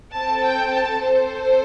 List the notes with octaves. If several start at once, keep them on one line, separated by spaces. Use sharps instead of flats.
C4 A4 A5
G5
A5
C4 A4 C5